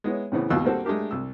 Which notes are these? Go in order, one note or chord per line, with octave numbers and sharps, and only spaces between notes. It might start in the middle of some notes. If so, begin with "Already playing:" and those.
G#3 B3 E4 C#5
A2 C#3 E3 B3 C4
G#1 D#2 B2 F4 E6 F#6
G3 A#3 C4 F#4 A4
G#3 A3 D4 G4 A#4
C2 E6